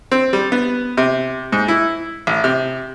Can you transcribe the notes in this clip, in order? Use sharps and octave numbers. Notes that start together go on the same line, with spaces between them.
C4
G3
B3
C3
G#2
E4
A1
C3